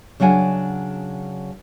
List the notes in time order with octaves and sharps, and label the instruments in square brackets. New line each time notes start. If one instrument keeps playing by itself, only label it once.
[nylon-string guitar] C#3 F#3 D4 F#5 G#5